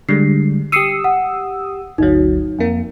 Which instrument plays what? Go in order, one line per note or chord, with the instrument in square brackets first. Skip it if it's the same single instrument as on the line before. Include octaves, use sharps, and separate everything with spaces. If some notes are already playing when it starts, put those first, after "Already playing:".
[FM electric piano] D3 G3 G#3 [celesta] C7
[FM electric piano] G4 D#6 E6 [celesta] C7 C#7 D#7
[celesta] F#5
[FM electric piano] G1 D2 F#3 [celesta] D#4
[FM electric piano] F2 A#3